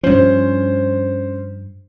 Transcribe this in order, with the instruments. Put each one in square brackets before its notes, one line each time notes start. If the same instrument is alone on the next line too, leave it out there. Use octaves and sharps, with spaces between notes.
[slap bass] G2 F3 [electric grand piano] C#4 C5